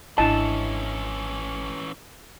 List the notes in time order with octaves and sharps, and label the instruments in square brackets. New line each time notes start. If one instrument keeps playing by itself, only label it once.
[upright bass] G#1 [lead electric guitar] E3 C#4 [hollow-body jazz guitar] D4 E4 D#5 [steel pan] A5